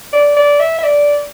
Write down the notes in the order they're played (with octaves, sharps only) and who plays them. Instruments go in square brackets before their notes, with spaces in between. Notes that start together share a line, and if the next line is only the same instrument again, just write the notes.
[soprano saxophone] D5
D5
E5
E5
D5